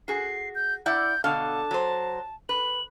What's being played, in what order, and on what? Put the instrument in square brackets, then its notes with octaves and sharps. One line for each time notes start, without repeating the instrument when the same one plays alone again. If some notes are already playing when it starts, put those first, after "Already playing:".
[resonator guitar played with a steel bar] F#4 G#4 [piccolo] C7
[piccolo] G6
[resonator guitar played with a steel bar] E4 D5 F#5 [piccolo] G6
[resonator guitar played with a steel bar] B2 D3 F5 [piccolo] A5
[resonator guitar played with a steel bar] F#3 C5
[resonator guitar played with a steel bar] B4 [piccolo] F#7